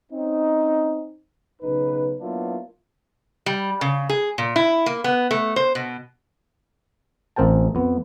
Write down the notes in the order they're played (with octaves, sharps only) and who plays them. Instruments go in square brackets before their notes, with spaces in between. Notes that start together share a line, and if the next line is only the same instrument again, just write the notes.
[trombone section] C4 C#4 D#4
B1 C#3 D#4 B4
F#3 A#3 B3 D4 E4 F4
[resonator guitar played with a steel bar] G3
C#3
G#4
A#2
E4
A#3
B3
A3
C5
B2
[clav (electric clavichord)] A1 C4 A#4 G5 A5
F2 B3